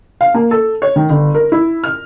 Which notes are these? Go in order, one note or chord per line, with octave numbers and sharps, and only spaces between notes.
F5
A#3
A4
C#5
D#3
G1
A#4
E4
F6